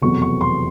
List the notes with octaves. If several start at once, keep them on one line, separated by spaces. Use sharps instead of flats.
F1 E2 B2 F#3 C#6
C#6
C6